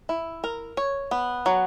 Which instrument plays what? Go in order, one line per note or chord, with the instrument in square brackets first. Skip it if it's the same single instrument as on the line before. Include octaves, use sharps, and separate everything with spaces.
[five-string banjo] E4
A#4
C#5
B3
F#3